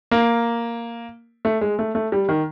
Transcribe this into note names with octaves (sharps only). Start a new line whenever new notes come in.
A#3
A3
G#3
A3
A3
G3
D#3